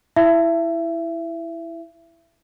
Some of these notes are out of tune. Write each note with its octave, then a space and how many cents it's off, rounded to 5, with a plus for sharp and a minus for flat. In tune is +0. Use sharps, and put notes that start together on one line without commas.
E4 +0 E5 +25